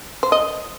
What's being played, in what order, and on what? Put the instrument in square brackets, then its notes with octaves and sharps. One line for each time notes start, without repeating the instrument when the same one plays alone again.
[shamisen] C5
D#5